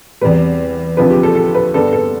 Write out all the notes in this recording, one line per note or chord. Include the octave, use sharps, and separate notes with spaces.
E2 C3 G3 B4
D2 C3 F3 C4 B4
G4
A4
A4
B4
G2 D3 G3 B3 A4
A4